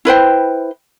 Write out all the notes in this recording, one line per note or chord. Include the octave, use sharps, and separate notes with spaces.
E4 B4 C5 G5